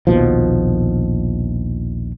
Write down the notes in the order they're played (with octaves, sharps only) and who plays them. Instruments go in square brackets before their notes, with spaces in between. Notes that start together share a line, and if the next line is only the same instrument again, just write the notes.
[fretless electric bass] A#1 D#2 B2 F3